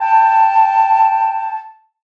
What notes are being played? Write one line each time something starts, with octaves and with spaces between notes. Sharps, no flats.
G5 A5